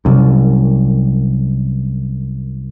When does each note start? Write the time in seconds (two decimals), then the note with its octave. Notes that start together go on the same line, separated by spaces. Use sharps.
0.05 C2 F#2